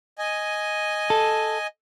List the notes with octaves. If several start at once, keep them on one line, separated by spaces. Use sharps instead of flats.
D#5 G#5
A4